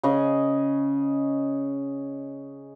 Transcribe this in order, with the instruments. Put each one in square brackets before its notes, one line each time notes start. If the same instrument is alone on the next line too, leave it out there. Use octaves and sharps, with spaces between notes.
[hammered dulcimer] C#3 G#4 D#5